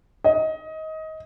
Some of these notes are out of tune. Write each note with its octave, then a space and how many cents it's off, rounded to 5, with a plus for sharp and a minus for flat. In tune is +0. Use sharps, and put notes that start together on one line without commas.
D#5 +20